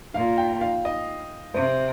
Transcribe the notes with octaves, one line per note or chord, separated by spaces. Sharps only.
A#2 F5
G5
F5
D#5
C3 C5